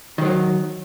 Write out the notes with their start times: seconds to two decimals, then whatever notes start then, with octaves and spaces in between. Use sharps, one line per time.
0.18 D#3
0.21 F3
0.25 F#3